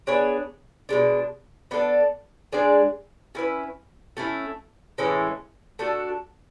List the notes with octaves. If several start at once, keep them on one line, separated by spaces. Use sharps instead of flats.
B3 D4 G#4 C#5
B2 G#3 D4
B3 D4 A4 D5
G#3 D4 G#4 D5
A3 C#4 E4 B4
A3 C#4 E4
A2 E3 G#3 C#4
A3 D4 F#4 A4